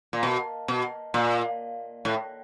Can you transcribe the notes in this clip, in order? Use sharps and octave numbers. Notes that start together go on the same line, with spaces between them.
A#2
B2
B2
A#2
A2